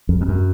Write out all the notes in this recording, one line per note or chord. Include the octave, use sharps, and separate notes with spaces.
F2
F2
F#2